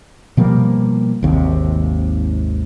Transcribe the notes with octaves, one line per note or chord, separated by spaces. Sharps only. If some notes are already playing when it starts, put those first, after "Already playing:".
B2 F3 G3 A#3
G#1 D#2 C3